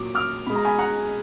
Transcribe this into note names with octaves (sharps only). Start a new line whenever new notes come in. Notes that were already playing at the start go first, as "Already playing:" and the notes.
Already playing: A#2 F#3 D6
D6 F6
B2 G#3 B5
A#5
G#5 B5
F#5 A#5